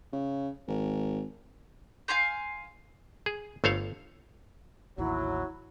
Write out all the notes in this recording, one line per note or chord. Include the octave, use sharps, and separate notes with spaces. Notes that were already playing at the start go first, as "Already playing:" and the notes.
C#3
G#1
F5 G#5 C6 G6
G#4
G1 A3 C5 C#5 F5
A1 D#2 D#3 F#3 E4